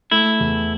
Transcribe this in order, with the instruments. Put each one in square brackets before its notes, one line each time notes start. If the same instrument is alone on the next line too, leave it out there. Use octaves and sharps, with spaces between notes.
[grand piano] A3 [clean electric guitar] E4
[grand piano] E2